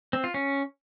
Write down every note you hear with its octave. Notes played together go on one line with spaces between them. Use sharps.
C4
F4
C#4